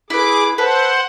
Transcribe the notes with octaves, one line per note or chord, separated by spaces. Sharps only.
E4 G#4 B4 D6
A4 B4 C5 F#5